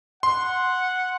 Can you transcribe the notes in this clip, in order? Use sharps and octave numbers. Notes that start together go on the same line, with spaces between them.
F#5 C6